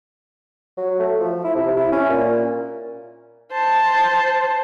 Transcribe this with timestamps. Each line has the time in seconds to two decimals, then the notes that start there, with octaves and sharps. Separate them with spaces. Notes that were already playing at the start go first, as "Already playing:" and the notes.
0.78 F#3
0.99 A3
1.19 F3
1.44 E4
1.56 C3
1.76 E4
1.92 C#4
2.10 A#2
3.52 C5 A5